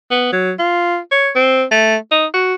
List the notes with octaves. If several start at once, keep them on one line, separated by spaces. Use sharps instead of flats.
B3
F#3
F4
C#5
C4
A3
D#4
F#4